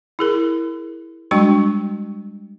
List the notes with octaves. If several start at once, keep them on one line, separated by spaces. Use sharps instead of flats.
E4 G#4 A#4
G3 G#3 D4 F#4 G5 C#6